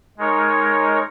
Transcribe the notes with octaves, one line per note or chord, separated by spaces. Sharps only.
G#3 D#4 A#4 C#5